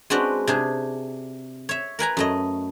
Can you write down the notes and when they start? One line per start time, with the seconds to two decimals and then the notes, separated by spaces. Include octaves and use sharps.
0.10 G#3 C4 D4 F#4 B4 D5
0.47 C3 D4 G#4
1.69 C#5 E5
1.99 A#4 B4 G#5 A#5
2.17 F#2 A3 D#5